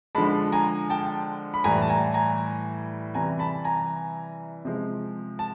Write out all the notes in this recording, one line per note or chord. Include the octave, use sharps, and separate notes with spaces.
D3 F3 G#3 A5 B5
G#5 A#5
G5 A5
B5
A2 E3 G3 G#5 A#5
A5
G#5 A#5
G#5 A#5
C3 E3 G3 G#5 A#5
A5 B5
G#5 A#5
C3 F3 G#3
A5